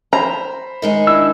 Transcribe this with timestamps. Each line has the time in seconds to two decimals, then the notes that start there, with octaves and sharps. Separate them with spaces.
0.13 C5 A#5 B5
0.82 D#3 G#3 D#4
1.07 D4 E4 E6